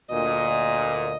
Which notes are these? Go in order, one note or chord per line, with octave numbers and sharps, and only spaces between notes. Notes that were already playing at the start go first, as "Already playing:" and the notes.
D2 A#2 D#5